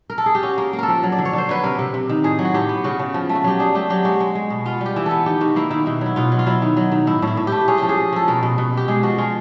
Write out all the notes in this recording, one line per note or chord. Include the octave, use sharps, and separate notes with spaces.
A#4
A4
G#4
G4
C#4 F#4
A#3
A#3
A4 A#4
F3
F#3
D5
D3
C#5
D3 C5
F#3 B4
C3 A#4
C3
C3
D#3
A2 G#4
F#3
F#4
A2 G4
B3
C#3 F#4
C#3
F3
A3
F#4
F#3 G4
D4 G#4
A3 G4
F#3 G4
G#3 F#4
G#3
G#3
B2
B3 F4
G3 G4
E3
B3 A4
D#3 G4
D#3 F#4
A#3 E4
D#3 E4
B2 E4
F#3 E4
B2 F4
F#3
F4
F#3 E4
D#3
F#3
D#3
A2 E4
A2 E4
A2
A3 G4
C#4 G#4
F3 G4
G#4
C#4
F3 A4
B2 A#4
B2
B2
B2 G4
G#3 G#4
F3 F#4
G#3 F4